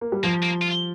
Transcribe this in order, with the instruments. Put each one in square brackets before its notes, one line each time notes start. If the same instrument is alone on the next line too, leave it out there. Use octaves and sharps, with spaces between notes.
[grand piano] A#3
G3
[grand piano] F3 [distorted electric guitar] A#3
[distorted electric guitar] A#3
F4